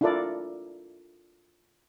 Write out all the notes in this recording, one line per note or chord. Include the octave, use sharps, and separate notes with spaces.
D4 E4 F4 A4 A#4 D5